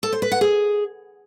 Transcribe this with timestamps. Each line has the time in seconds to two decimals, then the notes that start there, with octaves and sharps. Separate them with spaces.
0.03 A4
0.12 C5
0.22 B4
0.32 F#5
0.41 G#4